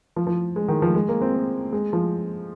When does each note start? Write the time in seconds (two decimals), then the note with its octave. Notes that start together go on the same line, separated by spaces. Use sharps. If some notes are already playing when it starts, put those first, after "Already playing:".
0.16 F3
0.27 F3
0.56 G#3
0.68 D#3
0.82 F3
0.95 G#3
1.09 A#3
1.22 C4
1.33 A#3
1.72 G#3
1.93 F3